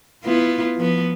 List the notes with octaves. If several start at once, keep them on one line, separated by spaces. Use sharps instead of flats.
B3 E4 F4
F3 B3